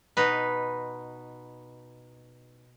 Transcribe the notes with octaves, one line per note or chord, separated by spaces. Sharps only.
B2 D#4 B4